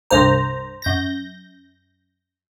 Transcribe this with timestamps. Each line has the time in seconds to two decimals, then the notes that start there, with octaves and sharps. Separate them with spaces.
0.11 C2 G2 C5 A#5
0.82 F#2 G6 A#6